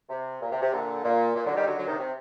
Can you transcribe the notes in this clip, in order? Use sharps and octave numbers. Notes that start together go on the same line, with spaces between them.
C3
A#2
C3
C3
A#2 D3
A#2
A#2
D3 F#3
D#3 G3
D3 F#3
D3 F#3
C3 D#3
C3